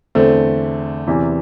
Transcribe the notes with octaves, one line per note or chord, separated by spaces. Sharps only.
E2 D3 A3 C4
E2 C3 E3